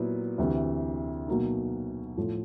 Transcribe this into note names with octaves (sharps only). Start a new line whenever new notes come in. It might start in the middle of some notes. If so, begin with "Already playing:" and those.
Already playing: A#2 F#3 B3 E4
D2 C3 E3
B2 F#3 A#3 D#4
A2 F3 A3